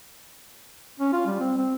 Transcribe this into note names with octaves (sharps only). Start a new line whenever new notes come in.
C#4
F4
G3
C4
C4